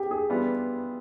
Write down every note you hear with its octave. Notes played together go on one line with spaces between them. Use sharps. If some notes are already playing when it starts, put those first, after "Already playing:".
Already playing: G4 G#4
G#4
E3 G3 B3 D4 F4